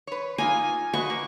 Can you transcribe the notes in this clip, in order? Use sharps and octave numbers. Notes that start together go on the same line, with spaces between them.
B4 C#5
A#3 D#4 F4 G#5
F#4 B4 D#5 C#6
A#3